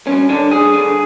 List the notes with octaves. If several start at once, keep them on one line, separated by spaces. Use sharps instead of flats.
G2 C#4
D3 D4
G2 G#4
D3